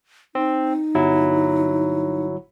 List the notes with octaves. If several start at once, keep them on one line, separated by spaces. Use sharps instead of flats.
C4 D#4
G1 F#3 E4